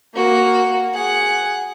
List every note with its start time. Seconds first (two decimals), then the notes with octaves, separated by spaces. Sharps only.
0.14 A#3 F#4
0.94 G#4 F#5